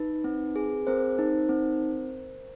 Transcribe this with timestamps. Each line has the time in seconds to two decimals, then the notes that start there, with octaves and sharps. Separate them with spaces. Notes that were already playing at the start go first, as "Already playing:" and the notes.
Already playing: D#4 B4
0.24 C4
0.56 G#4
0.87 C4 A#4 C5
1.18 D#4
1.49 C4